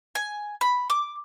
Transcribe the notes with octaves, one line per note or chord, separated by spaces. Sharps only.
G#5
B5
D6